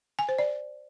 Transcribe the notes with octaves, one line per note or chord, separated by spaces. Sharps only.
G#5
C5
D5